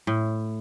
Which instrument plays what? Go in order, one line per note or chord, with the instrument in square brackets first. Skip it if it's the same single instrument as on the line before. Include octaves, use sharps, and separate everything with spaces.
[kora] A2